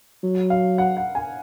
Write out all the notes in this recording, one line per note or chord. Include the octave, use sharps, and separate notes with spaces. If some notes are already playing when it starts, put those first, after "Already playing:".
F#3
F5
F#5
F#5
G#5